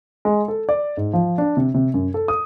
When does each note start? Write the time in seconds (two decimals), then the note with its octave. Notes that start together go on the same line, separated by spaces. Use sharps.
0.25 G#3
0.48 A4
0.69 D5
0.97 G#2
1.13 F3
1.38 D4
1.57 C3
1.74 C3
1.94 F#2
2.14 A4
2.28 D#6